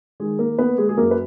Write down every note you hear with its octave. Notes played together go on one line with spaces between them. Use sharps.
D#3 G#3 G#4
A#3 A#4
A#3 B3 B4
G#3 G#4
G#4
F#2 A#3 A#4
B4